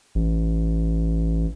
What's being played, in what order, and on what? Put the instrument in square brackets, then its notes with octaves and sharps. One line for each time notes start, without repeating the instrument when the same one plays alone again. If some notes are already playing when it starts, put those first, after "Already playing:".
[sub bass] A1